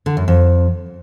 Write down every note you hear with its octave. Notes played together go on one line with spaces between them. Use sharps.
D3
F#2
F2